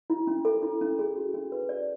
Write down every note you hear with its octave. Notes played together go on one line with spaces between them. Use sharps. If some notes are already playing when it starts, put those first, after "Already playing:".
E4
C#4
A4
E4
C#4
G#4
F#4
C#4
B4
D5